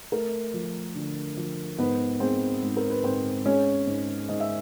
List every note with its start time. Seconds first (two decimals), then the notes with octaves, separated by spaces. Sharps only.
0.12 A3 A#4
0.54 F3
0.95 D3
1.37 F3
1.78 G#2 B3 B4
2.20 G#3 C4 C5
2.62 G#2
2.77 A#4
2.90 B4
3.04 G#2 C4 C5
3.45 G#3 C#4 C#5
3.87 G#2
4.29 G#2 D#5
4.40 E5